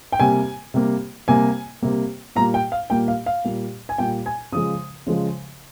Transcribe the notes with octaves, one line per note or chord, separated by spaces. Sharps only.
G5
C3 G3 A#3 G#5
C3 G3 A#3
C3 G3 A#3 G#5
C3 G3 A#3
A#2 G3 A#3 A#5
G5
F5
A#2 G3 A#3 G5
F5
F5
A#2 G3 A#3
G#5
A#2 G3 A#3 G5
G#5
C#3 F3 G#3 D#6
C#3 F3 G#3